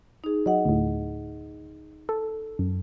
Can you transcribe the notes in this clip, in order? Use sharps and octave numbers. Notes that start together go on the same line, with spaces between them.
D#4 G#4
F#3 D#5 F#5
D2 A2
A4
F#2